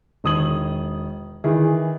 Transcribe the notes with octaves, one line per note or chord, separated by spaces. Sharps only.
E1 D#3 D#6 G#6 F#7
D#3 E3 E4 G#4